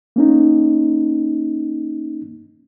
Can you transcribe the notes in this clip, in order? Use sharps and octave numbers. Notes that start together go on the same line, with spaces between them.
A#3 C#4 D#4